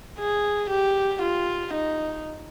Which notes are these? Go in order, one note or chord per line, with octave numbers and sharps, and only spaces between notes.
G#4
G4
F4
D#4